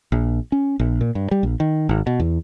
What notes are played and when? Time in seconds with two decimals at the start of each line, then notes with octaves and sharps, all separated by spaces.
0.12 A#1
0.52 C#4
0.79 A#1
1.01 A#2
1.15 G2
1.31 G3
1.43 A#1
1.60 D#3
1.89 G#1
2.07 B2
2.20 E2